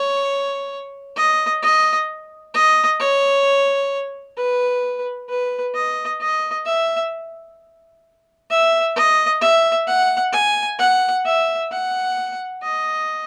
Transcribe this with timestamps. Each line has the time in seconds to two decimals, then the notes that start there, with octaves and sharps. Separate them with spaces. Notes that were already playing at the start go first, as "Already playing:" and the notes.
Already playing: C#5
1.16 D#5
1.62 D#5
2.54 D#5
3.00 C#5
4.37 B4
5.29 B4
5.75 D#5
6.21 D#5
6.66 E5
8.50 E5
8.96 D#5
9.42 E5
9.87 F#5
10.32 G#5
10.79 F#5
11.25 E5
11.71 F#5
12.62 D#5